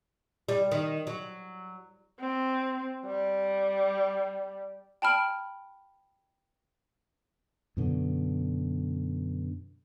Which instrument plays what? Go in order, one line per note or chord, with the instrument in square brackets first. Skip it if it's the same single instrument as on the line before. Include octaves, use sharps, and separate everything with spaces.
[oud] G3
D#3
F#3
[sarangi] C4
G3
[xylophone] G5 A5 B5 F6 D7
[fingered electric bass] F#2 B2 D3